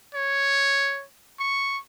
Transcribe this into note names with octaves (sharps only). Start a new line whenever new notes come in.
C#5
C#6